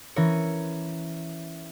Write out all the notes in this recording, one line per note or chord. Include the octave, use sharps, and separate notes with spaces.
E3 C#4 A#4 C#5